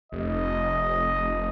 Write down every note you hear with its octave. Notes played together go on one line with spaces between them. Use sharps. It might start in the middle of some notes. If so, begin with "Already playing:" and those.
F1 D#5